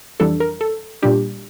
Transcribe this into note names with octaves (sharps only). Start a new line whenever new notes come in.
F2 E3 G3 D4 A4
A#4
A4
A#2 G3 D4 G4